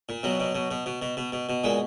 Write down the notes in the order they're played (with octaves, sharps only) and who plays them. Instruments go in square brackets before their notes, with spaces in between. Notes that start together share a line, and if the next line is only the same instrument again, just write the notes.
[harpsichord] A#2
B2 F#3
B2
B2
B2
B2
B2
B2
B2
B2
A#2 G#3